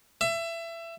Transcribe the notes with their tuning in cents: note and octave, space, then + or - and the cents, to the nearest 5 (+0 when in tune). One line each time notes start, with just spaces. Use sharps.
E5 +25